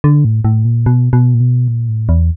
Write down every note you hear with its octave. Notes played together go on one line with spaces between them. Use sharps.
D3
A2
A2
A#2
B2
B2
A#2
B2
A#2
A2
E2